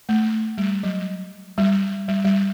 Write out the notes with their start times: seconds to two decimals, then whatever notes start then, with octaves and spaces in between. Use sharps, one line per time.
0.09 A3
0.58 G3
0.83 F#3
1.58 G3
2.08 G3
2.25 G3